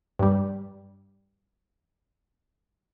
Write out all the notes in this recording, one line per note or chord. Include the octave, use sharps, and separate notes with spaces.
G2 G3